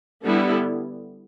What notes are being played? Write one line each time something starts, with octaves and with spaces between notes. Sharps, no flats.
D3 G3 B3 E4 A4